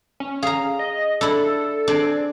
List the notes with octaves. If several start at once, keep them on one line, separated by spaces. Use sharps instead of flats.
C#4
G#4 F5 A#5
D#5
D4 E4 A4
C4 D4 G#4 D5